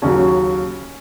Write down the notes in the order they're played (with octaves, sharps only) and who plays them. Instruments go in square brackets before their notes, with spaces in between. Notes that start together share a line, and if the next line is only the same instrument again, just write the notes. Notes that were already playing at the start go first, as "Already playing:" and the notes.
[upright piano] D#2 C#3 F#3 C#4